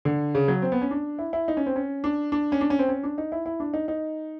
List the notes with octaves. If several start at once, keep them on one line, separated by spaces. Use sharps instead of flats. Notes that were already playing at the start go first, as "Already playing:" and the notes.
D3
C#3
F#3
C4
B3
C#4
D4
E4
E4
D#4
C#4
C4
C#4
D4
D4
C#4
D4
C#4
C4
C#4
D4
D#4
E4
E4
D4
D#4
D#4